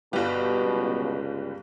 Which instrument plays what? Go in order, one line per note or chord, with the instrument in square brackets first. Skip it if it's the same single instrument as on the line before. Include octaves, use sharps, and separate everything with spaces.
[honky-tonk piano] G1 G4 [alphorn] B2 [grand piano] G3 B4 F5
[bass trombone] C#2